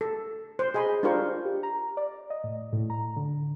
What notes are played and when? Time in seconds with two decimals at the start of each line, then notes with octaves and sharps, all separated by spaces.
0.01 A4
0.59 C5
0.74 G#4 D#5 G#5 B5 C6
1.03 D4 F4 G4 A#4 C5 C#6
1.45 G4
1.63 A#5
1.97 D5
2.30 D#5
2.44 A2
2.73 A2
2.90 A#5
3.16 D3